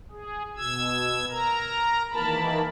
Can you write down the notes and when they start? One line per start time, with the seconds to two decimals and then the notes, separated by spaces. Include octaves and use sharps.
0.11 G#4
0.57 B2 E6 G#6
1.31 A#4 A#5
2.15 D#3 E3 A#3 A#4 A5 B5